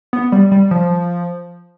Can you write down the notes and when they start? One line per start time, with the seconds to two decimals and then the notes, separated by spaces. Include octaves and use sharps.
0.13 B3
0.32 G3
0.52 G3
0.71 F3